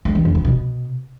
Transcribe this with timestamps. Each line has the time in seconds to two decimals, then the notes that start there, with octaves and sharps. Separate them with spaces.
0.05 G#3
0.15 E3
0.25 E2
0.35 F3
0.45 B2